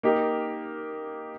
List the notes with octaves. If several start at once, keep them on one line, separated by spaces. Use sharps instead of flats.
A#3 D#4 G4